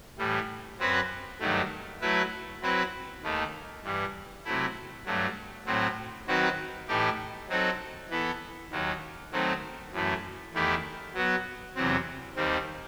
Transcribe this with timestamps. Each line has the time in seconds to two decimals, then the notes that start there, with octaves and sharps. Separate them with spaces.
0.18 A2 E3 G3
0.79 F#2 F#3 C4 F#4 B4
1.40 G2 D#3 F#3 A3
2.01 F#3 A3 E4 B4
2.61 F#3 C4 E4 B4
3.23 D#2 D#3 A3 D#4
3.83 G2 E3 G3
4.45 C3 F#3 A3 E4
5.06 G2 F#3 A3
5.66 A2 F#3 C4
6.27 D#3 F#3 C4 F#4 B4
6.88 A2 E3 A3 D#4 G4
7.49 F#3 C4 D#4 F#4 A4
8.10 E3 B3 E4 A4
8.71 D#2 D#3 F#3
9.31 D#3 F#3 A3 C4 D#4
9.92 F#2 E3 A3
10.54 E2 D#3 A3 E4 G4
11.14 F#3 B3 F#4
11.76 E2 C3 F#3 C4
12.36 D#2 D#3 G3 C4